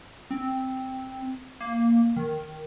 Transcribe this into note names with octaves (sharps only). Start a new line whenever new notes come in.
C4
A#3
D#3